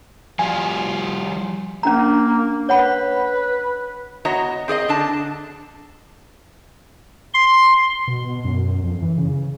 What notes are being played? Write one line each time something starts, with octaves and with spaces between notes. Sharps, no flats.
F3 G3 F4 G#5
A#3 C#4 D4 A#5
B4 C#5 F#5 B5
B3 F#4 C#5 D#5 A#5
C4 G#4 C#5 D#5
D3 D4 A5
C6
B2
F#2
F2
E3
C#3